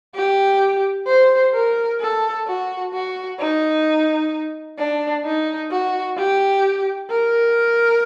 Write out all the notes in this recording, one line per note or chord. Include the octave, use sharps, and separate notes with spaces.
G4
C5
A#4
A4
F#4
F#4
D#4
D4
D#4
F#4
G4
A#4